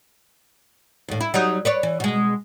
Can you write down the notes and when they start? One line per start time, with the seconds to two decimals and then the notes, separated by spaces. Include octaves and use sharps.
1.08 D#2 A2
1.21 E4
1.34 F#3 G3 D#4
1.65 B4 C#5 D5
1.83 E3
2.00 B2 G#3